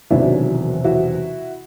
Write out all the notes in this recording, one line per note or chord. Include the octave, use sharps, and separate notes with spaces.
E1 E2 C3 D#3 F#3 D4 E4
E4 F#4